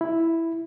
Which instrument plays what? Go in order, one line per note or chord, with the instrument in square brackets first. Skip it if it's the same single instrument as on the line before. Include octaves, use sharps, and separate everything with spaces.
[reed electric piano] E4